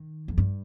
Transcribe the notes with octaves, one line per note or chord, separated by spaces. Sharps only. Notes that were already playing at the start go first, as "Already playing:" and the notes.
Already playing: D#3
F2
G2